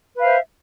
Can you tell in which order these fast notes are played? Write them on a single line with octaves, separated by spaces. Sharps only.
B4 F5 C5 E5